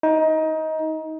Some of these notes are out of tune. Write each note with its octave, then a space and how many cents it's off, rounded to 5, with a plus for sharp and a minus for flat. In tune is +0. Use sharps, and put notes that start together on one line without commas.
D#4 +20